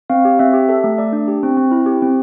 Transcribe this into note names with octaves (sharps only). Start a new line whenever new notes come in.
C4 F5
G4
C4 E5
G4
A4 E5
A3
A3 D5
D4
G4
C4
C4
E4
G4
C4